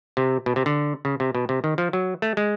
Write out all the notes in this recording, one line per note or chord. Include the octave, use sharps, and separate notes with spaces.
C3
B2
C3
D3
C#3
C3
B2
C3
D#3
F3
F#3
A3
G#3